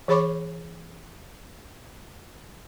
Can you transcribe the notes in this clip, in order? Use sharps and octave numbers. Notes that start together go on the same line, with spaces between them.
E3 G#4 C#5 B5 C#6 D6